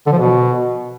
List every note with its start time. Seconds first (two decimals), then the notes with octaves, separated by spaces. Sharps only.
0.06 D3
0.12 F3
0.18 B2